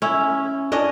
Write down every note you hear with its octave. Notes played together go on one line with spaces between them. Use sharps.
C#4 E4
C#4 D4 D#5